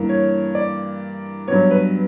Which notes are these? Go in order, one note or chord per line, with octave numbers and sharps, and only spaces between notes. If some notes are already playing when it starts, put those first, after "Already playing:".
Already playing: G2 E3 A#3
C#5
D5
G2 F#3 B3 C#5
B4